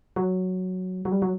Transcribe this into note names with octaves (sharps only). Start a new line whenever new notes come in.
F#3
F#3
G3
F#3